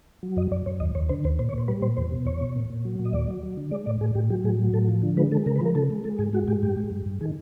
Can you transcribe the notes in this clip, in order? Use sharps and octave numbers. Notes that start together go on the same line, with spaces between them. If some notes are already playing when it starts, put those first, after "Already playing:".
F#3
F#2 D#5
F#2 D5
F#2 C#5
D#2 D#5
D#2 C#5
D3 C5
D#2 C5
A#2 C5
C#5
A#2 C5
G3 B4
A#2 C5
E2 C5
B2
E2 C#5
B2
A#2
A#2
F#3
A#2
D#5
D#2 D5
F#3
F#3
D3
G#3 D5
A2 D5
A2 G#4
A2 G4
F#3 G4
A2 G#4
F#3
A2 A4
F3
D3
G#3 B4
G#3 A4
C#3 A#4
B4
F3 A#4
C#3 A4
G#3
G#3 A4
G#2 G#4
G#3 F#4
G#2 G4
G2 G4
G#3
G2
G2
D#3 G#4